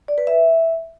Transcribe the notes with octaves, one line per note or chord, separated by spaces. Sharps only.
D5
B4
E5